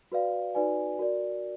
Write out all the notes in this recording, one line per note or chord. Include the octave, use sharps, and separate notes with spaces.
F#4 B4 D5 F5
D#4 F#4 B4 D5 G#5
F#4 A#4 D5